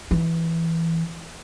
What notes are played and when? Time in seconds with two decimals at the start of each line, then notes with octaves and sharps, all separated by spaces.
0.11 E3